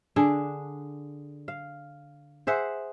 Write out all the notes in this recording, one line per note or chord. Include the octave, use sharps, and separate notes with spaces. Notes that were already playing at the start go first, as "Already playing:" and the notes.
D3 D4 G#4
F5
G#4 C5 E5 F#5